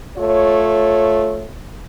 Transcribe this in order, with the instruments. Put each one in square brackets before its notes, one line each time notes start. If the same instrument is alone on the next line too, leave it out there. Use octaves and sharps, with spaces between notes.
[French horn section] A3 F4 C#5